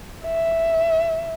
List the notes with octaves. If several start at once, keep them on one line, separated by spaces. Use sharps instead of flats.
E5